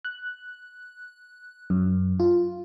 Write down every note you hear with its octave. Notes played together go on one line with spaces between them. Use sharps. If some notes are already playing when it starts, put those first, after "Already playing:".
F#6
F#2
F4